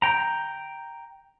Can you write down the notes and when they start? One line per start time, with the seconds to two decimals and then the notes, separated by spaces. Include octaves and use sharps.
0.02 G5 A#5